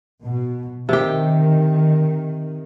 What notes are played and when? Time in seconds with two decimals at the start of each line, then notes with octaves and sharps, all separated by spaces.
0.24 B2
0.89 C3 D#3 G4